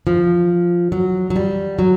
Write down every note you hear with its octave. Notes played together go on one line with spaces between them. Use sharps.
F3
F#3
F#3
G3
F#3